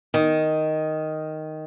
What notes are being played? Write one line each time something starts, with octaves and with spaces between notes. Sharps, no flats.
D#3